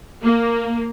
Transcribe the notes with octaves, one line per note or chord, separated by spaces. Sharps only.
A#3